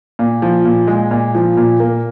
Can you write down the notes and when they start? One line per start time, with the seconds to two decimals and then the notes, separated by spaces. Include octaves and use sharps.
0.19 A#2
0.42 F3
0.65 A#2
0.87 G#3
1.11 A#2
1.35 F3
1.57 A#2
1.80 A#3